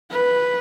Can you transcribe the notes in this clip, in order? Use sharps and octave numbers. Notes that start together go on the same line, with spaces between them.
B4